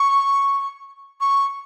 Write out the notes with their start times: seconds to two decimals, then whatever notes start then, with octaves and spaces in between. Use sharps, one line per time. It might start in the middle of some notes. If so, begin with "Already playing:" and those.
Already playing: C#6
1.20 C#6